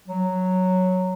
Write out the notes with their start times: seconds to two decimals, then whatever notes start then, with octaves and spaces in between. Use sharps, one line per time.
0.07 F#3